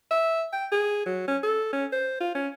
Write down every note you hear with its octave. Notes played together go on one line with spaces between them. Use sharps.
E5
G5
G#4
F#3
C#4
A4
C#4
C5
F4
C#4